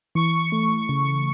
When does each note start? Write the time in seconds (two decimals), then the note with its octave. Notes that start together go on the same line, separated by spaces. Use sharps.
0.15 E3 C#6
0.52 A3
0.89 C#3